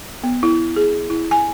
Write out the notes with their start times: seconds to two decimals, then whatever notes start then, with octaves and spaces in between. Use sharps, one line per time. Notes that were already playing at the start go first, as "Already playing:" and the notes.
0.23 B3
0.43 E4
0.76 G#4
1.10 E4
1.31 G#5